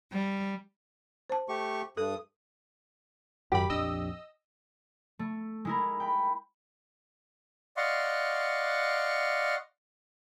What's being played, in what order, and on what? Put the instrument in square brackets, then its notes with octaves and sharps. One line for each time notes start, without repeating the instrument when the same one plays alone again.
[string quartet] G3
[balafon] C5 A5
[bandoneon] A3 G4 C#6
[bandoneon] G2 D#6 [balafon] A4
[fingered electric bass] G#1 [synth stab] F#2 B5 [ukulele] G4
[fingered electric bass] A#1 F2 D4 [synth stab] D#5 E6
[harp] A3
G#3 E4 A#4
G5 B5
[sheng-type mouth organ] D5 D#5 F5 F#5 C6 C#6